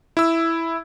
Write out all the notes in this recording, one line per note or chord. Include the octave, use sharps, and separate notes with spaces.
E4 E6